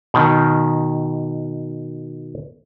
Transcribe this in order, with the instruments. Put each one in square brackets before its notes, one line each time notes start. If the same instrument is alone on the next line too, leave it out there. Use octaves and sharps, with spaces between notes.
[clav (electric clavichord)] B2 D#3